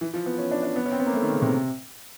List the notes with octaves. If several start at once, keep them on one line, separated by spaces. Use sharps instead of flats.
E3
F3
B3
C#4
D4
D4
B3
C#4
C4
B3
A#3
A3
D#3
C#3
C3